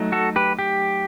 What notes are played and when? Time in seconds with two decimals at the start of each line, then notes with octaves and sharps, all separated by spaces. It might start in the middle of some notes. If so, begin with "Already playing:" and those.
Already playing: F#3 A3 D#4
0.12 F#4 A4
0.36 G4 B4
0.59 G4